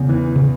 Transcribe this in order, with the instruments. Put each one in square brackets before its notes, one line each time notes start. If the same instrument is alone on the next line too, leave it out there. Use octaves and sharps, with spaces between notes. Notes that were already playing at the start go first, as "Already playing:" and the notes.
Already playing: [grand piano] E2 [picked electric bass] C#3
[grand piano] E3
[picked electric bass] C#3